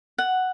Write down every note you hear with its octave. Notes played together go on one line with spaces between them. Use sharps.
F#5